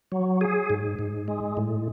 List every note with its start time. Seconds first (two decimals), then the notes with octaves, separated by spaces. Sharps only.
0.12 F#3
0.41 G#4
0.70 G#2
0.99 G#2
1.28 G#3
1.57 A2